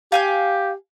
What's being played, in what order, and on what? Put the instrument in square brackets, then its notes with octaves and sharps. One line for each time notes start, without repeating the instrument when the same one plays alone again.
[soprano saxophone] G4 [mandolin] F5 G#5 G6